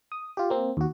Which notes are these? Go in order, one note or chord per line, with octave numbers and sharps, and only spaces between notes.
D#6
F4 G4
A#3 C4
D#2 F#4